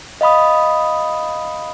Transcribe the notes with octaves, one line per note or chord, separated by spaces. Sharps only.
D#5 F5 B5 D#6